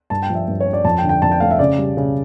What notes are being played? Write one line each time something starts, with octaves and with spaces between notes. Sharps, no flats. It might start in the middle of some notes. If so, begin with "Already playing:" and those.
G2 A5
G5
F3
E5
G2
C#5
C#4
D5
F2 A5
G5
D3
G5
F2 A5
G5
A3 F5
E5
C#3 D5
G3
C#3